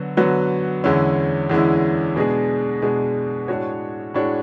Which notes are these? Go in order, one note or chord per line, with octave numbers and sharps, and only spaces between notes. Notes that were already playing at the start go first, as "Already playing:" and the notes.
Already playing: D3 F#3 B3 F#4
D3 F#3 B3 F#4
E2 D3 G#3 C#4 E4
E2 D3 G#3 C#4 E4
B2 G#3 D4 G#4
B2 G#3 D4 G#4
A2 G#3 D4 F#4 C#5
A2 G#3 D4 F#4 C#5